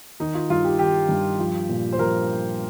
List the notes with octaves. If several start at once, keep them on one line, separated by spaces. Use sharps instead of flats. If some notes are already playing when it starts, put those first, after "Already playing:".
D#3 D#4
F4
G2 F4
G4
D#3 G4
G2
F3
A#2
C5
F3 A#4